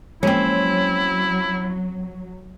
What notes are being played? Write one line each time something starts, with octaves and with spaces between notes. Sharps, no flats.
F3 F#3 G#3 A#3 C4 C#4 E4